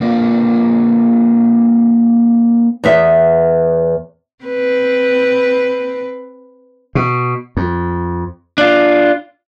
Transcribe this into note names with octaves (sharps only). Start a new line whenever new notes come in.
A#3 C4 D4 F4
E2 B3 E5
C4 B4
B2
F2
D4 F4